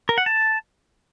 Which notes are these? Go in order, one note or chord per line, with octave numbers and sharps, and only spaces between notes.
A#4
F#5
A5